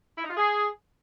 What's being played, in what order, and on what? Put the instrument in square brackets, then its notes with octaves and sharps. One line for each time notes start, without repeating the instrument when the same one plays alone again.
[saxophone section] E4
D#4
F4
G#4